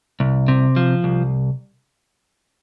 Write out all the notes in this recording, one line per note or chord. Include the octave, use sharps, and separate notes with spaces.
C2
C3
F3
C2